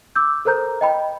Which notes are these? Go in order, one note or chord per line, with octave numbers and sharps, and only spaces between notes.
D6 E6 G6
A4 A#4 C5 A#5 G6
D#5 G5 B5